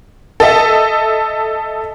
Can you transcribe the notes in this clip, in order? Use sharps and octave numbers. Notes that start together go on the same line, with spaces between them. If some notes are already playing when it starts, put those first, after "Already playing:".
A4 D#5 E5